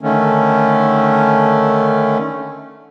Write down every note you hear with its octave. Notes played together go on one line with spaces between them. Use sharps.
D3 D#3 A3 C#4